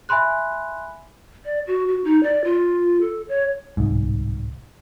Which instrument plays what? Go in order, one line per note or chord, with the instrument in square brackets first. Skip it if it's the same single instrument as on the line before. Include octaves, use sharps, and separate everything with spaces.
[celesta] E5 G#5 B5 C6 F#6
[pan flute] D5
F#4
F#4
D#4
D5
F4
A4
C#5
[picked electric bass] D1 C2 G#2